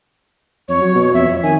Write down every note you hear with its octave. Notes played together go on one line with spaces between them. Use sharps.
F2 C#5
F#3
B2
F2 E5
F2
D#3 G#5